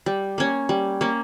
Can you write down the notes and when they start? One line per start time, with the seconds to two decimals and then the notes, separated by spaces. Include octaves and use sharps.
0.06 G3
0.38 A#3 C#4
0.69 G3
1.01 A#3 C#4